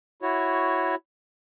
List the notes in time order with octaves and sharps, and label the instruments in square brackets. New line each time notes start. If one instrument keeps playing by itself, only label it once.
[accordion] E4 F#4 C#5